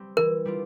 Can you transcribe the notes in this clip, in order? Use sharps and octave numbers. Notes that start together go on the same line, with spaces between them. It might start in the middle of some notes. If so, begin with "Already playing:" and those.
Already playing: G3 C4
E3 A#4
G3 D4 F4